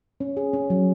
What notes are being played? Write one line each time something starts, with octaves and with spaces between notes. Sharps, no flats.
C#4
G#4
C#4
F#3